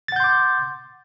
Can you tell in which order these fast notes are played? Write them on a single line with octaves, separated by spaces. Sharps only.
A6 F#5 G6 C6 D6